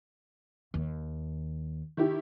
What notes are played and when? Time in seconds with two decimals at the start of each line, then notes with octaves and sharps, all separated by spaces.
0.74 D#2
1.97 D#3 E4 G4